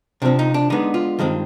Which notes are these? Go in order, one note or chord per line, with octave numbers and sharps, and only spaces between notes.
C3 F3 C4 D4
D#4
D4
D3 G#3 B3 D#4
F4
G2 D#3 G#3 C4